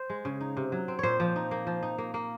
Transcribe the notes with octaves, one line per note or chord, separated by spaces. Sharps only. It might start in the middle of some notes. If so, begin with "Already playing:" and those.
Already playing: C5
G#3
C#3
D#4
C3
F#3
C4
A#2 C5 C#5
F3
D#4
A#3
F3
D#4
A#3
A#3